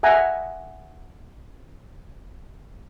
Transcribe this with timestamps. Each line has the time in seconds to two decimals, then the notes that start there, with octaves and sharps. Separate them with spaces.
0.03 E5 F#5 G#5 A#5